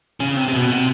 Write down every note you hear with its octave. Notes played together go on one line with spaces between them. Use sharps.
C#3
C3
C3
B2
C3